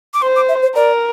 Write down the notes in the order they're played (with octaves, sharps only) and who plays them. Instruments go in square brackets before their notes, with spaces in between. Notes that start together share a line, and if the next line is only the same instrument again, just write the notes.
[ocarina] D6
[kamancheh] C5 [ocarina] C6
[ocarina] D6
E5
C5
[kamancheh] A#4 [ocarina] D5